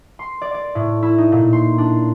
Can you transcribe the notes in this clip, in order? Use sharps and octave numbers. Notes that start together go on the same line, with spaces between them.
C6
D5
D5
A2
E4
D#4
A#2
C6
D4